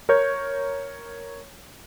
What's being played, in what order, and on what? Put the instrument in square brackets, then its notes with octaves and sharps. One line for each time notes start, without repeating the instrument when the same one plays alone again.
[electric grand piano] A#4 C#5 G6